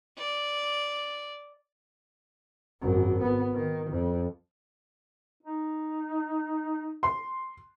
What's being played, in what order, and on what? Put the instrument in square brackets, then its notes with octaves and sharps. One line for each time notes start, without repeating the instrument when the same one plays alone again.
[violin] D5
[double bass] G#1 F#2
B3
D#3
F2
[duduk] D#4
[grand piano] C6